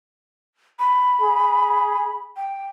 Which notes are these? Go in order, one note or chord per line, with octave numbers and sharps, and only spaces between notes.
B5
G#4
G5